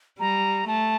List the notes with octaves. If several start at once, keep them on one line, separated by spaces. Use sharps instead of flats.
G3 A#5
A3 A5